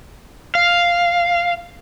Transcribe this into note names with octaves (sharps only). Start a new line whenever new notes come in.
F5